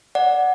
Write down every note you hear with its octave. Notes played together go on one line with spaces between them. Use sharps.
D5 F#5